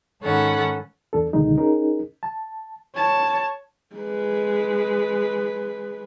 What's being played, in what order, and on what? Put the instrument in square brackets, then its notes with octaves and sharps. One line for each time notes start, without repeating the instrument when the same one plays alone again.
[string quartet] G#2 D#3 C#4 A4 F#5 B5
[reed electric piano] E2 D4 A4
C#2 B2 D3 D#3 G#3 D#4
C#4 D#4 G#4 A#4
A5
[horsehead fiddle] C#5 A5
G#3 B4